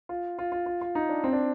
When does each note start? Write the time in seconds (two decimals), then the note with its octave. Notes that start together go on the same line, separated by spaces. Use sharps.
0.09 F4
0.39 F4
0.52 F4
0.66 F4
0.81 F4
0.95 D#4
1.09 D4
1.24 C4
1.33 D4